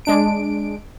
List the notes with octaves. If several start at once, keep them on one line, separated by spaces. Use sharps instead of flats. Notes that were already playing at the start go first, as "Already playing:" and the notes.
G#3 D4 D7